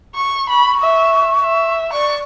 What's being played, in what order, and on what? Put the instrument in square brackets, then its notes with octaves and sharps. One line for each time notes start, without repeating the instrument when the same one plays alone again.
[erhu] C#6
[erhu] B5 [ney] C#6
[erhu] E5
E5
[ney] D5 [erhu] C#6